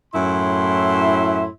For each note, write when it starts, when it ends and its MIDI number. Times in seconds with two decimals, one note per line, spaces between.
0.15 1.48 42
0.15 1.48 45
0.15 1.48 64
0.15 1.48 76
0.15 1.48 84